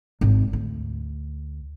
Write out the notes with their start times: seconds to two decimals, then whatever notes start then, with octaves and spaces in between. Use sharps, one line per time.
0.21 G#1
0.53 D2